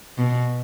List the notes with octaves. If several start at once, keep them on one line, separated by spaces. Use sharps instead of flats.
B2